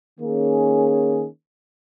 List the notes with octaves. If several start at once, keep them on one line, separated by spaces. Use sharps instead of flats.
D#3 A#3 C#4 G#4